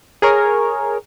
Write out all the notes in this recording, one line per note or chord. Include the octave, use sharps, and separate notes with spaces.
G#4 A#4 C#5